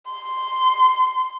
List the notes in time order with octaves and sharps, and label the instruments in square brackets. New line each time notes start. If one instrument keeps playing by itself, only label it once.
[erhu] C6